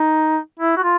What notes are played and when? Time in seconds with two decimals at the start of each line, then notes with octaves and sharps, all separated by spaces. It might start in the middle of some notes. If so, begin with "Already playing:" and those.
Already playing: D#4
0.60 E4
0.76 F#4
0.83 F4